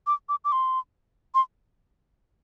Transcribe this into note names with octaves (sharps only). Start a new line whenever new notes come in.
D6
D6
D6
C6
C6